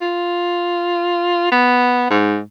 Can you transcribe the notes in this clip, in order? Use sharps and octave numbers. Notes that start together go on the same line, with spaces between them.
F4
B3
G#2